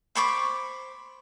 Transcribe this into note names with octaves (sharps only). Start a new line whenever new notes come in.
C5 B5 C#6 D6